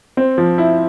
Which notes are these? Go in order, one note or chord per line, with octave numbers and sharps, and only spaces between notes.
C4
F3
E4